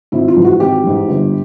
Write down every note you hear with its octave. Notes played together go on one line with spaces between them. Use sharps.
G#1 E4
F4
G#2 E3
F#4
G#1 G4
G#2 E3
G1